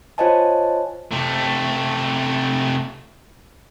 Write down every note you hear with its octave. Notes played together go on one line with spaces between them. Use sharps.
F4 C5 C#5 D#5 G#5 A5
C3 A3